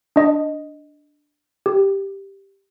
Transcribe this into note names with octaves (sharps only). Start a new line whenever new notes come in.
D4 D#5
G4